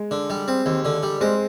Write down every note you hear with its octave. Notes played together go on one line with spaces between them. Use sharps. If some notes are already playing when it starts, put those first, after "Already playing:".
Already playing: G#3
D3
G3
C4
D#2
D3
G3
G#3 C4